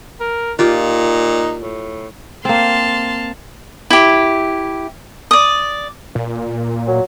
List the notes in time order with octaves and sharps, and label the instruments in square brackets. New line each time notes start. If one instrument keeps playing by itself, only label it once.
[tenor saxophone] A#4
[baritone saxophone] A#2 [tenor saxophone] D#4 [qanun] F4 G4
[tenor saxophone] A2
[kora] A#3 C4 [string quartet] A5 C6 F6
[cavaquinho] E4 G4
D5 D#6
[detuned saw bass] A#2
[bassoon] F#3